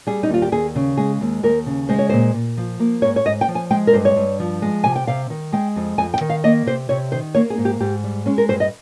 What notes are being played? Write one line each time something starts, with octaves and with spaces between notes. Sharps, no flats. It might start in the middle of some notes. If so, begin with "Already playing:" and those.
G3 G#4
D#4
D#2 F4
G4
D#2 G#4
C#3
G#3 G#4
D#2
D#2 A#4
C#3
G#3 C5
C#5
A#2 C5
A#2
F3
A#3
G#2 C#5
C#5
G#2 D#5
G5
F3
G#5
G#3 G5
A#4
G2 C5
C#5
G2
F3
G#3
C3 G#5
G5
C3 F5
D#3
G#3 G5
F2
F2 G#5
G5
D#3
F5
A#3 D#5
C3 C5
C3 C#5
D#3 C5
A#3 C#5
G#4
G#2
G4
G#2 G4
G3
G#3 C#4
A#4
G2 C5
D#5